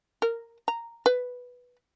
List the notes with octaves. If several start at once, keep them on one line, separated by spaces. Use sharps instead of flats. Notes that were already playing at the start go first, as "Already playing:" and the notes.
A#4
A#5
B4